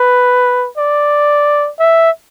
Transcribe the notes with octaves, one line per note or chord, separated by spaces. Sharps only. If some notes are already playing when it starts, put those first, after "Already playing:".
Already playing: B4
D5
E5